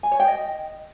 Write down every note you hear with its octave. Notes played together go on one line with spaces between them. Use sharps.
G#5
C#5
G5
D#5